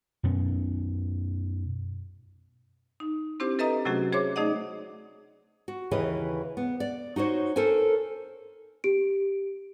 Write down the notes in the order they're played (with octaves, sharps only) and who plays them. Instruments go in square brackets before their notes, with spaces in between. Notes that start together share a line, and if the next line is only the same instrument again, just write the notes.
[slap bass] F#2 B2 C#4
[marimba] D#4
C4 D4 E4 G4 C5
A4 B4 D#5 E5 A#5 D#6
C3 F#3 A3 C#4 F#4 G#4
G#4 C5 C#5 E5 C6 D6
A3 D#4 G#4 D5 D#5 F#5
[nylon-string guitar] F#4
D#2 C#3 E3 G#4 B4 D#5
B3
D5
D#4 F#4 C5 C#5
A4 A#4 C5 G#5
[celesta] G4 D7